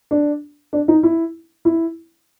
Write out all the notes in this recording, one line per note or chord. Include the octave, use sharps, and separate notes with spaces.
D4
D4
D#4
E4
E4